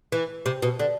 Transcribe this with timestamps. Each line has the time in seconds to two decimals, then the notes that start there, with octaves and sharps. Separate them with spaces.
0.12 E3
0.46 C3
0.62 B2
0.79 D3